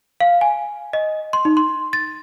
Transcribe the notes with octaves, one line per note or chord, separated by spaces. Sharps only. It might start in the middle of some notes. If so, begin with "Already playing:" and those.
F5
G#5
D#5
C6
D#4
C6
A6